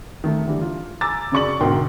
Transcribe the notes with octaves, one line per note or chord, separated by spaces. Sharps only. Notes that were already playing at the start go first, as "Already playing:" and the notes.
D#3 A3
D3 E3 G3
F4
G#5 A#5 D6 E6 A6
F#2 C#3 D5 C#6 A6 F#7
D2 G#2 B2 A#4 G5 C6